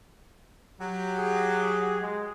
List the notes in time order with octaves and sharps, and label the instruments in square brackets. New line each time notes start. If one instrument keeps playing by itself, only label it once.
[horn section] F#3 G4
[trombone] G#4
G#3